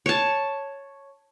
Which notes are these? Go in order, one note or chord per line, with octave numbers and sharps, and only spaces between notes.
C#5 A5